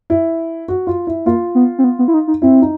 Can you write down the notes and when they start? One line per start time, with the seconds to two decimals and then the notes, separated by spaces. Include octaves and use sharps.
0.10 E4
0.68 F#4
0.87 F4
1.07 E4
1.26 A#3 F4
1.55 B3
1.78 C4
1.84 B3
1.99 B3
2.08 E4
2.14 D#4
2.28 D#4
2.42 C4 E4
2.62 D#4